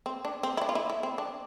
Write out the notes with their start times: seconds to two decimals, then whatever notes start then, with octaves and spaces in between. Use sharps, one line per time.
0.06 C4
0.25 D4
0.43 C4
0.57 E4
0.62 D4
0.69 F4
0.75 E4
0.90 E4
1.03 C4
1.18 D4